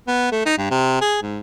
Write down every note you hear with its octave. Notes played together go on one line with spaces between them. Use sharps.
B3
A3
D#4
G2
C3
G#4
G#2